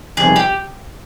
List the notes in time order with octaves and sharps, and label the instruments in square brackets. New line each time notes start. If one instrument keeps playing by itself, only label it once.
[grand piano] F2 C3 D#3 G3 B3 [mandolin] G#4
[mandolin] G4